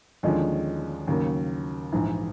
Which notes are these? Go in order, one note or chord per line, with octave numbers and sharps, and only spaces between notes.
D#2 D3 F3 G#3 C#4
D#2 C#3 F#3 A#3
A#1 G#2 E3